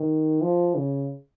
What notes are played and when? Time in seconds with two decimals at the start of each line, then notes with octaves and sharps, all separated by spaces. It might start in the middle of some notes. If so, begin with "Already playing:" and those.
Already playing: D#3
0.42 F3
0.76 C#3